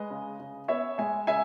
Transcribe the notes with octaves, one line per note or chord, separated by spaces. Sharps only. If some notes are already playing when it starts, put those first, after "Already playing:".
Already playing: G#3 B4 D#5
C#3
C#3
B3 C#5 E5
G#3 E5 G#5
C#3 E5 G#5